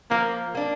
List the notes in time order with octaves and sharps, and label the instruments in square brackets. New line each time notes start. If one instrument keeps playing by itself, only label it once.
[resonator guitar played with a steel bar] F3 [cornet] A#3
[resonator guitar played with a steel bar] A#3 D4